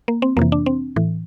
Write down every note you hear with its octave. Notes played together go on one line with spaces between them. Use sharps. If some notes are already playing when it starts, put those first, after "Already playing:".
A#3
C4
F2 C3 E3 A#3
D4
C4
A2 E3